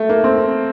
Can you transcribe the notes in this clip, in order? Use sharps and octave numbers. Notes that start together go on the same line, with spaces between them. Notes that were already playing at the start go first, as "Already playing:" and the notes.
Already playing: A3
A#3
C4